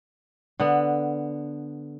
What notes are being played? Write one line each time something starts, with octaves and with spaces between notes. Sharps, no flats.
D3 B3